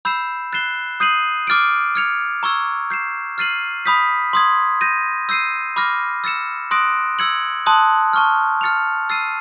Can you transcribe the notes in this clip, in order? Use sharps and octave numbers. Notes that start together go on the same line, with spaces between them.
B5 E6 G6 C7 E7
F#6 A6 C7 E7 G7
D#6 G6 C7 D#7 F#7
D6 F6 A6 D7
F6 G#6 C#7 F7
A#5 C#6 E6 G#6
G6 C7 E7
F6 A6 C7 D#7 F#7
B5 D#6 G6 B6
C6 D#6 G#6
G6 A#6 D#7
E6 G6 C7 D#7
B5 D6 F6 A#6
E6 A6 C#7 E7
C6 D#6 F#6 A#6 D7
E6 G#6 C#7 F#7
A5 C6 D#6 F#6
A5 C#6 F6
F6 A6 C#7 F7
E6 A6 C7 D#7